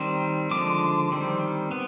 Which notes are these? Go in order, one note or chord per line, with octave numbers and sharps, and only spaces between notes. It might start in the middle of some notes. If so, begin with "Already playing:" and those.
Already playing: D#3 G3 C4
D3 F3 G#3 D6
D#3 G3 C4
B3